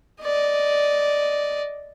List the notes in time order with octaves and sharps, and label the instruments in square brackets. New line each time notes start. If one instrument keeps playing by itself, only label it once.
[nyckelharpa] D5 D#5